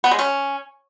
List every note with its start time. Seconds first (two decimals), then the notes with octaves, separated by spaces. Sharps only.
0.04 B3
0.11 G#3
0.19 C#4